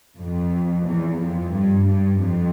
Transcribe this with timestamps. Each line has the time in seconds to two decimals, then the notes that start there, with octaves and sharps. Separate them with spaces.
0.17 F2
0.85 E2
1.18 F2
1.51 G2
1.85 G2
2.19 F2